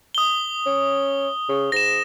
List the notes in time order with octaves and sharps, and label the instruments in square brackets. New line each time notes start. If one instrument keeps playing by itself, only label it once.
[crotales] D#6 G7
[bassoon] C#4
C#3
[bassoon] G#2 [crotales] A#6 E7